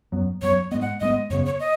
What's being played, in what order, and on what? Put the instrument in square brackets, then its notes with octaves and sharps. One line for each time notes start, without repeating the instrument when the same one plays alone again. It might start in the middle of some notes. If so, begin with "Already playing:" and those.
[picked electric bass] F#2 F#3 B3
[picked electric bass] F#2 F#3 B3 [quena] C#5
[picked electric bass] G#2 G#3 B3 [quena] D#5
[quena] F#5
[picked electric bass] G#2 G#3 B3 [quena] D#5
[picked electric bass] F#2 C#3 B3 [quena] C#5
[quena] C#5
D#5